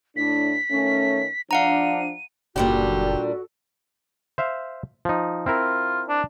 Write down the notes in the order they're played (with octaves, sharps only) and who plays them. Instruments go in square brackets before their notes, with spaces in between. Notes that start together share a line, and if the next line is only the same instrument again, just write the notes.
[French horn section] A2 D4 [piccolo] B6
[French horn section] D#3 A3 C#4
[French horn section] F3 D4 [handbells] F5 F#5 A#5 [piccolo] D#7
[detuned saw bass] F#1 [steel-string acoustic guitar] A#2 G3 D4 [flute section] F#4 A4 [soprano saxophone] G4
[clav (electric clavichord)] C5 E5 F5
F3 D#4
[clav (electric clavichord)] C4 E4 A#4 [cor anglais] F4
[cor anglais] D4